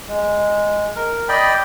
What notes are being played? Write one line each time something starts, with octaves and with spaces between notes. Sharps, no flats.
G#3
A#4
D5 D#5 G5 B5